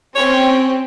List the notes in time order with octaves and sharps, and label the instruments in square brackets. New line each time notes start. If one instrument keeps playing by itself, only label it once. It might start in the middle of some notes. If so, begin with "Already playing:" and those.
[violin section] C4 C#4 G4 [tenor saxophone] C#5